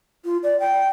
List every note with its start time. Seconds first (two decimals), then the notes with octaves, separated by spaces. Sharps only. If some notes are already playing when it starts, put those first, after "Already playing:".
0.25 F4
0.43 D5
0.60 G5